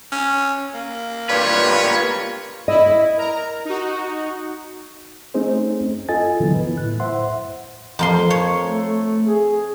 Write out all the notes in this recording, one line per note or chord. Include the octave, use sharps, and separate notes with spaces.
C#4
A#3
G2 F4 G4 B4 C#5
E4 D#5
A#4 A#5
D#4 F#4
A3 C4 C#4 D#4 G#4 C5
F4 A4 D#5 G#5 A6
A#2 D3 E3 F#3 B3 E4
B4
A2 E4 F#6
C5 E5 F#5 C6
F2 A#3 C6
C#5
A3
G#4